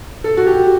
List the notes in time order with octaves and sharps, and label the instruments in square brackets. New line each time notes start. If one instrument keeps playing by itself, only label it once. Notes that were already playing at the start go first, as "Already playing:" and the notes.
[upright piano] A4
F#4
G4